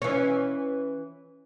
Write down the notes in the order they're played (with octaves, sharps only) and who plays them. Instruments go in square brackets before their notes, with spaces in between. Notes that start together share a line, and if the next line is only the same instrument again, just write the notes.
[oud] E3 C#4